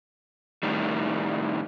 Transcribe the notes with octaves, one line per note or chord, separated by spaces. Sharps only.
A2 D#3 G3